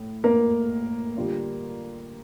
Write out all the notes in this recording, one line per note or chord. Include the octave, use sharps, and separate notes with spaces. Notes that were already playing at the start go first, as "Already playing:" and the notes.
Already playing: A2
A#3 A#4
D3 G3 D4 F4